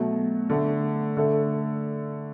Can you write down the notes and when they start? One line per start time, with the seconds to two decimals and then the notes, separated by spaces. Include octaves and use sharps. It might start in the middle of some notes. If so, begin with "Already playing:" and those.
Already playing: B2 F#3 A3
0.50 D3 A3
1.17 D3 A3